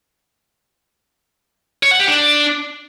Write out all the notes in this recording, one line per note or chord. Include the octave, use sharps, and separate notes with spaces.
C#5
F#5
G4
D4